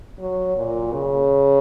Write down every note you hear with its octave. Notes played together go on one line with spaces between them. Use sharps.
F#3
A#2
C#3